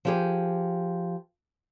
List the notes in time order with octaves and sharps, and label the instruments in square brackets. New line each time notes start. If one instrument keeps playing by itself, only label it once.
[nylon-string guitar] F3 G4 G#4